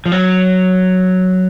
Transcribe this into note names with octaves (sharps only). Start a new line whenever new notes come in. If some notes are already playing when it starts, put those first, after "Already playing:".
F3
F#3